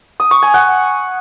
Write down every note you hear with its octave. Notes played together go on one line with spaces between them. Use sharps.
D#6
C#6
G#5
F#5